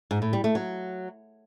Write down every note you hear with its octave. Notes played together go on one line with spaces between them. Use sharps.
G#2
A2
G3
A3
F#3